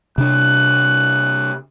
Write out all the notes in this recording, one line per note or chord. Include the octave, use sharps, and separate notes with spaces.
C3 D4 F#6